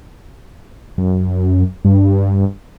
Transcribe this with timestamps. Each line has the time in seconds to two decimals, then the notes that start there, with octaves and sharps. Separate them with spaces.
0.98 F#2
1.85 G2